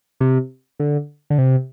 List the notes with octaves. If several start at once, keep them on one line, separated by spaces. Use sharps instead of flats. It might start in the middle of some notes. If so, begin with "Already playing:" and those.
C3
D3
D3
C3